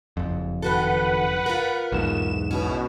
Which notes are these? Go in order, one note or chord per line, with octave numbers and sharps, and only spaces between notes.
F#1 F2
D#3 F#4 A4 B4 F#5
F4 A#4
B1 E2 G#2 E7
B2 C#4 E4